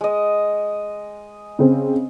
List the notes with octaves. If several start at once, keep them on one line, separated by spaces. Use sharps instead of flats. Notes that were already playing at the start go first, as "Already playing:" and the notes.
G#3 D#5
C#3 C4